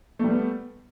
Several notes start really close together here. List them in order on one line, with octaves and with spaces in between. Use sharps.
A3 G3 B3